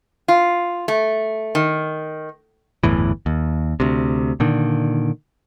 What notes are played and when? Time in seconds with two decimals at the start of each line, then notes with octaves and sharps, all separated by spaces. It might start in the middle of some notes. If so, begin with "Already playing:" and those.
0.28 F4
0.88 A3
1.55 D#3
2.84 G1 E2 A2 E3
3.26 D#2
3.80 D2 C3
4.40 A#2 D3 D#3